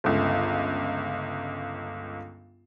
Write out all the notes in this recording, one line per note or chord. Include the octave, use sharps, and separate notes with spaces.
G1 C#2